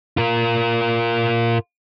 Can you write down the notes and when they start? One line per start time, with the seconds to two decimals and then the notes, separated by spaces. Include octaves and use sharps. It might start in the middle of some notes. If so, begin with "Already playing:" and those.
0.17 F4 A#4